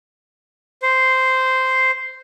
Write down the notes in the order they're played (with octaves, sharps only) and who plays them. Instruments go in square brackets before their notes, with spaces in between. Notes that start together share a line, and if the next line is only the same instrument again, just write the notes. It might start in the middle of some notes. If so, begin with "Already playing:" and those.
[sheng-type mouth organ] C5